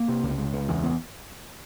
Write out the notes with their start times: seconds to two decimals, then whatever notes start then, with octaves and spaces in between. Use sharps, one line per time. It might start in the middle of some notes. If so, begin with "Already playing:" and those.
Already playing: A#3
0.08 C3
0.23 C#2
0.38 C#2
0.53 C#2
0.68 E2
0.83 E2